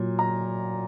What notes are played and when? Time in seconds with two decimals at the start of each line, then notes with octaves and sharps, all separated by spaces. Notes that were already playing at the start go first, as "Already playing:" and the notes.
Already playing: A#2 F#3
0.19 A#5